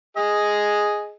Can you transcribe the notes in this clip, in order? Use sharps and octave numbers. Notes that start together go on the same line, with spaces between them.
G#4 D#5